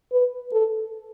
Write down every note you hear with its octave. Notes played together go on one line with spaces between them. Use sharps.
B4
A4